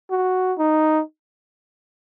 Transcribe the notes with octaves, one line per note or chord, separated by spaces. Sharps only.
F#4
D#4